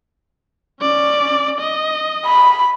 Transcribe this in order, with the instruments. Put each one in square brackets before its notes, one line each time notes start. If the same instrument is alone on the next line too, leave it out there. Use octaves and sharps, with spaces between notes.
[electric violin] C#4 D5
D#5
[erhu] B5